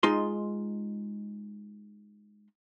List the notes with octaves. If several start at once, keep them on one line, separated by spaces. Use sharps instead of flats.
G#3 D#4 F4 C6